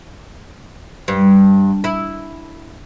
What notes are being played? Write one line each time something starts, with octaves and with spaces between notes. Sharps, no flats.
G2
E4